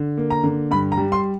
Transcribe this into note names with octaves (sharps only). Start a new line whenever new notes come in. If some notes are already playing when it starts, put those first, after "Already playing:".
Already playing: D3
A#3
A#5
D3
G2 B5
A#5
G3
C6